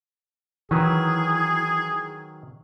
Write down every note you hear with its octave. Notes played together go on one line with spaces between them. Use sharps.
D#3 E3 F#3 G#4 B4